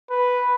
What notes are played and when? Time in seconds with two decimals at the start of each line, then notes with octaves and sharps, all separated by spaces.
0.10 B4